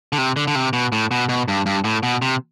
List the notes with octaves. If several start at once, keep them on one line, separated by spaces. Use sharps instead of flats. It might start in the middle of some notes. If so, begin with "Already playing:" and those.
D3
C3
D3
D3
C3
B2
A2
B2
B2
G2
G2
A2
B2
C3